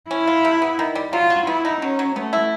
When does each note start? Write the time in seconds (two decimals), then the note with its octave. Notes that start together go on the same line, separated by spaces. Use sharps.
0.10 C#4 E4
0.27 F4
0.45 C3
0.62 B3
0.79 D#3
0.95 G3
1.13 F#3 F4
1.30 F#4
1.47 B3 E4
1.65 D#4
1.82 F#3 C#4
1.99 F#3
2.16 A3 B3
2.33 E4